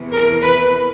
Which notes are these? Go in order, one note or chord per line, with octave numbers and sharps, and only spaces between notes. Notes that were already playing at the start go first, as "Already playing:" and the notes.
Already playing: E2 C3 E3
A#4
B4